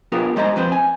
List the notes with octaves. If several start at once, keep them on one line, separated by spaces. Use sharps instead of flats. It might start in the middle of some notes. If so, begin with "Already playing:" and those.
B3 D4 F4 G4 G#4 A#4
G3 G#3 C5 D#5 F#5 A#5
F2 C4 B4 C5
G#5